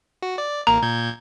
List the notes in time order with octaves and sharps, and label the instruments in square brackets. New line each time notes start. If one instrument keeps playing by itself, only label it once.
[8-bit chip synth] F#4
D5
[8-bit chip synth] A1 A#3 [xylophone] A#5
[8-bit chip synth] A#2 G6 G#6